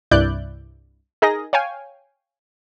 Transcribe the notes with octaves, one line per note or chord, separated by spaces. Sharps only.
C2 G2 E4 D5 F#6 G6
D#4 G#4 A#4 D#5 A#6
C#5 F5 G5 G#5